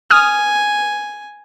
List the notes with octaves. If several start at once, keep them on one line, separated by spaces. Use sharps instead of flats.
G#5 D#6 F6